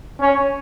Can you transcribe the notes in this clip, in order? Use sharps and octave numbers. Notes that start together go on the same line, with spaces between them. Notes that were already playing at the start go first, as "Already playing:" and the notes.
C#4